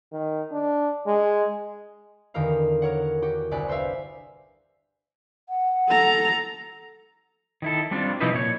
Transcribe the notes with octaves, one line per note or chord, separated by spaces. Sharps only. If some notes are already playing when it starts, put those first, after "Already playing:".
D#3
D4
G#3
E2 D3 D#3 G4 A#4 F5
A#4 C#5 F#5
F#4 G4 F#5
G1 C2 D5 G#5 F#6 B6
B4 C5 D5 E5 F5
F#5
A4 A#5
D#3 E4 A4
G3 C4 D4 F4
C3 F3 D#4 E4 B4
A#2 C#5